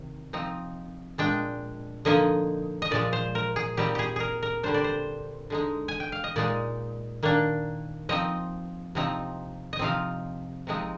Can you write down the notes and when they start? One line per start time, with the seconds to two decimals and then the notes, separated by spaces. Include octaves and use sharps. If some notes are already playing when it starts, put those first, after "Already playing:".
Already playing: C3 D#3
0.33 F3 C4 D#4
1.18 A#2 G#3 D4 G5
2.05 D3 F3 A#3 D#4 D#5
2.82 D#5
2.91 A#2 F3 G#3 D5
3.13 C5
3.35 A#4
3.56 G#4
3.77 A#2 G3 C4 D#4 G4
3.95 G4 G#4
4.16 G#4 A#4
4.43 A#4
4.63 D3 G3 D4 C5
4.74 D5
4.84 C5
5.50 D3 G#3 D#4
5.88 G#5
6.00 G5
6.12 F5
6.24 D#5
6.36 A#2 G#3 D#4 D5
7.23 D#3 A#3 D4
8.09 F3 C4 D#4 D#5
8.95 C3 F3 C4 D#4
9.73 D#5
9.79 C3 F3 C4 D#4 F5
10.67 C3 F3 G#3 C4 D#4